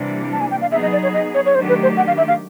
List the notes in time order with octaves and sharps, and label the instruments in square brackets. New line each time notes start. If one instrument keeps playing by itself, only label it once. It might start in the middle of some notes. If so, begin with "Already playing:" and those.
Already playing: [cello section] C3 E3 G3 A#3 D4
[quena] A5
G#5
G5
F5
[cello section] F#3 B3 D#4 G#4 [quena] E5
[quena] D#5
D5
C#5
D#5
C#5
C#5
[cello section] D#3 F#3 A3 D4 G4 [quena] C5
[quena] B4
C5
F#5
F5
E5
F5